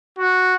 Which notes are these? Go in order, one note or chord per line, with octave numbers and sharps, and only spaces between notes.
F#4